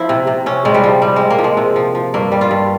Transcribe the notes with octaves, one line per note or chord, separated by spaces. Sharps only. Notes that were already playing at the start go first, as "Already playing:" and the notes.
Already playing: F3 E4
C3
C3
C3 C#4
C3 G#3
G3
F3
C3 G3
C3 G#3
A#3
F3
G#3
C3
F3
F3
G2 A#3
G3
F4
G2